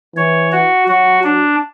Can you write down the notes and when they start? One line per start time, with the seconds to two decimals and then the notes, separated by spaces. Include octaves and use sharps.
0.16 E3 C#5
0.52 F#4
0.88 F#3 F#4
1.24 D4